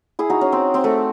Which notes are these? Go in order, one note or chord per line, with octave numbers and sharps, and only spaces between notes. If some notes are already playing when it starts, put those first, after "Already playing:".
E4 G#4
D#4 F#4
C#4
C4
C4
A3